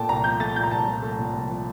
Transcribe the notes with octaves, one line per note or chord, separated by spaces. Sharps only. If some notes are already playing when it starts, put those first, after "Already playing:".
Already playing: A#2 A3 G5 A5
C2 A#5
F3 G6
A3 A6
A#2 G6
A#5
C2 A5
F3
A3
A#2
C2
F3